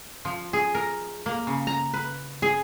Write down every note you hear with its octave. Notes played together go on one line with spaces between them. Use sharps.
F3
G#4
A#4
A#3
C#3
A#5
B4
G#4